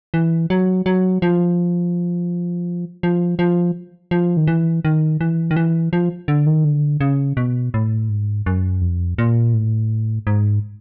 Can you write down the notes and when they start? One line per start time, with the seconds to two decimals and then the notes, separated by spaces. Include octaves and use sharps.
0.14 E3
0.50 F#3
0.86 F#3
1.22 F3
3.03 F3
3.39 F3
4.11 F3
4.37 D#3
4.47 E3
4.85 D#3
5.21 E3
5.51 D#3
5.56 E3
5.93 F3
6.28 D3
6.46 D#3
6.64 D3
7.01 C#3
7.37 B2
7.74 A2
8.09 G#2
8.46 F#2
8.81 F2
9.18 A#2
9.54 A2
10.27 G#2